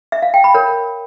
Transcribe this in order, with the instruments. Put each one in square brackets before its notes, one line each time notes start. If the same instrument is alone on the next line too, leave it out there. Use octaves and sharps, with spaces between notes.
[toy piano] E5
F5
G5
B5
A#4 C#5